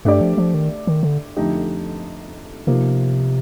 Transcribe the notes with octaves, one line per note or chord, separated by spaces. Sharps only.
G2 A3 D4 G4 D5
F3
F3
D#3
D#3
D3
F2 D3 A3 D#4 G4
C3 F3 A#3 D#4